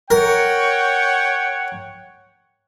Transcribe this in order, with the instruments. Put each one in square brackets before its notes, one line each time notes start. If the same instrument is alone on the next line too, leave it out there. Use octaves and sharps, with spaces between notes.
[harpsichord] A#4 [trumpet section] C#5 F#5 G5